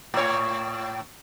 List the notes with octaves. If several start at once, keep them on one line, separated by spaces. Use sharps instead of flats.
A2 C#5